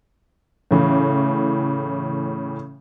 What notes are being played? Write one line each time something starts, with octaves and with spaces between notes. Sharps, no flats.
A2 C#3 E3